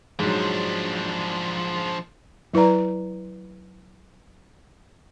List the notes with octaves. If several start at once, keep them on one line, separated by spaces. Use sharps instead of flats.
G#2 F3 F#3 D4
F#3 E4 B4 D5 A#5